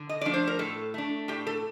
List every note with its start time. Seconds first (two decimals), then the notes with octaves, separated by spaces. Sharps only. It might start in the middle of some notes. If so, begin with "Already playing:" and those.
Already playing: D3
0.09 D#5
0.21 F3 A3 D4 D5
0.34 C5
0.47 A#4
0.59 A2 A4
0.94 A3 D4
1.28 A2 G4
1.47 A4